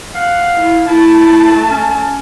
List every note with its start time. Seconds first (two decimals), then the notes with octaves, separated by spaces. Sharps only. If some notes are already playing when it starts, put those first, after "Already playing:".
0.14 F5 F#5
0.57 E4
0.88 A3 E4 A5
1.71 C#4